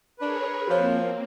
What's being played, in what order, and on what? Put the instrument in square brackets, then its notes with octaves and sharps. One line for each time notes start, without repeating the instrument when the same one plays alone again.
[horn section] D4 [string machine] G#4 A#4 C#5 [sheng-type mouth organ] B4
[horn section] F3 [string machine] A#3 C4 [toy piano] F#4 C#5